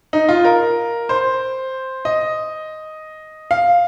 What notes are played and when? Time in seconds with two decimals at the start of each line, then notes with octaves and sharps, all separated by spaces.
0.13 D#4
0.29 F4
0.44 A#4
1.09 C5
2.05 D#5
3.51 F5